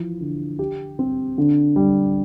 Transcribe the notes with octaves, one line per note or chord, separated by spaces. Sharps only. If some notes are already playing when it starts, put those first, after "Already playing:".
Already playing: E3 F3
D3
G4
C4
D3
G3